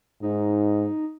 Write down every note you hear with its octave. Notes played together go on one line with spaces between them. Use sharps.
G#2 D#4